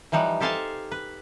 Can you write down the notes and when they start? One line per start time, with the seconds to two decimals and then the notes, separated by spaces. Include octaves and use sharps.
0.12 E3 F3 G3 D#4 F#5
0.41 G4 A4 C5 F5 G#5 A5
0.92 B4